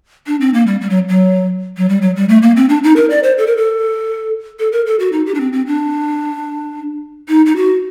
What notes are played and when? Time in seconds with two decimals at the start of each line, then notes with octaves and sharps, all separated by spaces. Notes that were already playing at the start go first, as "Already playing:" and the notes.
0.27 D4
0.41 C4
0.54 A#3
0.67 G3
0.81 G3
0.90 F#3
1.09 F#3
1.77 F#3
1.89 G3
2.02 F#3
2.16 G3
2.29 A3
2.42 A#3
2.56 C4
2.69 D4
2.84 D#4
2.96 A#4
3.10 D5
3.23 C5
3.38 A4
3.47 A#4
3.57 A4
4.59 A4
4.72 A#4
4.86 A4
5.00 F#4
5.12 D#4
5.26 G4
5.35 D4
5.40 C4
5.53 C4
5.67 D4
7.28 D#4
7.46 D#4
7.56 F#4